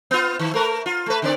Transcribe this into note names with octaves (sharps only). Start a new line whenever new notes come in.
B3 F4
D#3
A3 A#4 B4
F4
A3 B4
D3 C4 D5